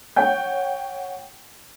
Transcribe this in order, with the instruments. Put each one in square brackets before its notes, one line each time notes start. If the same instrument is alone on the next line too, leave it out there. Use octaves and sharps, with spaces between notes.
[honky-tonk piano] C#5 F#5 G5 G6